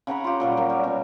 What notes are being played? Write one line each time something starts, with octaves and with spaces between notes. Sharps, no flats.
C#3 F#5 A#5 B5
F4 G4
A#2 F#3 G3
F#3 A#4
G3
B2